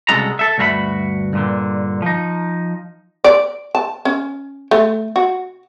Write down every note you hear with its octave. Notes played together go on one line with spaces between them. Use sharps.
C2 C#3 G#3 F#4 A4 A#5
A4 E5
D2 G2 F#4 A#4 E5 B5
G2 A#2 D3
F3 D#4
D5
A5
C#4
A3
F#4